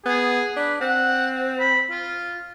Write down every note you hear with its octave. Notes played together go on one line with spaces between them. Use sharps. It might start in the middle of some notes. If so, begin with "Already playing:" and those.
B3 G#4
D4 B4
C4 F#5
B5
F4